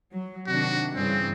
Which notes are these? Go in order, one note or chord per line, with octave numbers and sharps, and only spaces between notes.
F#3
C3 D#3 D4 F#4
G2 C#3 E3 C4